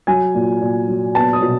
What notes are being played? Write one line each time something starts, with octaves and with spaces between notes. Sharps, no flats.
F#3 G#5
A#2
A#2
F#3
B3 A5
D#6
B2